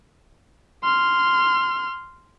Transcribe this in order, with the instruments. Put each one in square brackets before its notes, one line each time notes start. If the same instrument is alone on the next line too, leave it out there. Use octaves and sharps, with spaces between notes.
[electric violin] C6 F6